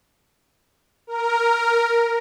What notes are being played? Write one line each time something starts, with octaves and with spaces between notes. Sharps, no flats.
A#4